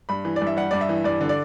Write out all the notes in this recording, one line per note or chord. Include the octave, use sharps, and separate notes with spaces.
G2 B5
E3
D5
G2 E5
G3 F#5
G2 D5
E5
E3
G2 D5
D3
D5